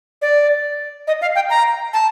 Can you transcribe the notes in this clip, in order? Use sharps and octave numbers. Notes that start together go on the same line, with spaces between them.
D5
D#5
F5
G5
A#5
A5